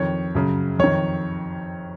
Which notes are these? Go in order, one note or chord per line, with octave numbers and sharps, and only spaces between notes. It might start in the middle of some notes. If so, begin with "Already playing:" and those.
Already playing: F2 D#3 C#5
F#2 C#3
F2 D#3 C#5